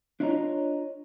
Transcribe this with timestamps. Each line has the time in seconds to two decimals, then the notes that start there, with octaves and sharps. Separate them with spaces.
0.20 D4 E4 F4 C#5 D#5 A#5